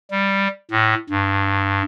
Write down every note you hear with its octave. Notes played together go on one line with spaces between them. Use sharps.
G3
A2
G2